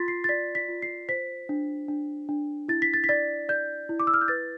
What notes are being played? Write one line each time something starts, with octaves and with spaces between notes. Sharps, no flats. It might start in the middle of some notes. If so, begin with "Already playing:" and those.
Already playing: F4 C6 A6 B6
C7
A6
D5 B6
B6
F4
C7
C5 B6
D4
D4
D4
E4 A6
B6
A6
B6
D5 A6
D5 G6
E4
D6
E6
F6
G6
B4 A6